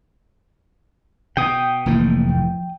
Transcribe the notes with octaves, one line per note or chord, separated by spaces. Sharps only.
B2 G5 D#6
F1 A2 E3 A#3
F3